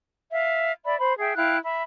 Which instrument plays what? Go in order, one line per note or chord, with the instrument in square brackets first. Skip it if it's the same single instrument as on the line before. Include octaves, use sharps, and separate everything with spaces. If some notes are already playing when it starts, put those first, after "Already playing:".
[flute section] E5 F5
D5 E5 B5
C5 B5
G#4 E5 G5
E4 F5 G5 F#6
E5 B5